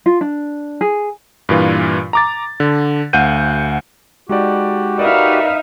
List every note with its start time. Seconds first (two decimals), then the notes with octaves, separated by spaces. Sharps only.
0.06 F4
0.21 D4
0.81 G#4
1.49 G2 A#2 E3 F4
2.13 A#5 D6 A6
2.60 D3
3.13 D2 F5 F#5 G6 D#7
4.29 G#3 D#4 F#4 G4 D5
4.99 D#4 A#4 B4 D5 E5 F5